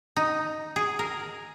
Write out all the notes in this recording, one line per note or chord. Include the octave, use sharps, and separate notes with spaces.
D#4
G#4
A#4